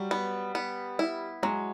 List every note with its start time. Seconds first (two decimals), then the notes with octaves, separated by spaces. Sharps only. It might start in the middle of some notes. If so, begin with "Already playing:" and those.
Already playing: F#3 G3
0.11 B3
0.55 B3
0.99 E4
1.43 F#3 G#3